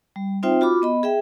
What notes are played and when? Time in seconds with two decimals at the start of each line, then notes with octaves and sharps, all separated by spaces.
0.16 G3
0.43 C4 D#4 F4 C5 E5 G5
0.61 F4 F#4 B5 D6
0.82 B3 D#5 B5
1.03 G#4 E5 G5